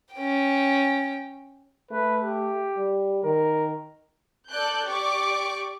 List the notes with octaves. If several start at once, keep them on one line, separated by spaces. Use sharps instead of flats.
C#4 G5
A3 B4
G4
G3
D#3 A#4
A4 D5 F#6 G6
G4 D5 C#6 D6